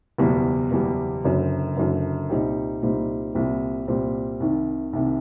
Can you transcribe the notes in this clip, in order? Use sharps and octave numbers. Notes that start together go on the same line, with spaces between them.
F#1 E2 B2 G3
F#1 E2 B2 G3
F#1 F#2 D3
F#1 F#2 D3
C2 A#2 G3 C4 D#4
C2 A#2 G3 C4 D#4
C2 A#2 G3 C4
C2 A#2 G3 C4
C2 C3 D#3
C2 C3 D#3